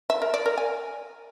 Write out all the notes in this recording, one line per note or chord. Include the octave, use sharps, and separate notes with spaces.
E5
A#4
D5
A#4
G#5